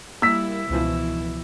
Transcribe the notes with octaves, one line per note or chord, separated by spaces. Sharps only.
G3 A#3 E4 E6 B6
C#2 B2 E3 F3 E4